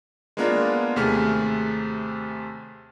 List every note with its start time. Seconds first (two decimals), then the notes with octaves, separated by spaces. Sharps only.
0.37 G#3 A#3 B3 D4 F4 A#4
0.96 D#2 C3 A3 G#4 F6